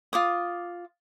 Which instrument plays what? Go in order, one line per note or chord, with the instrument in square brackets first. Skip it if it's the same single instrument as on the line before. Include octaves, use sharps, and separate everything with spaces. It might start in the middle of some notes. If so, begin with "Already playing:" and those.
[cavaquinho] F4 D6 D#6